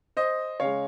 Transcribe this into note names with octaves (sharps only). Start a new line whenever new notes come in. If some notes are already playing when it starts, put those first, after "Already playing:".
C5 D#5
C#3 G#3 C#5 F5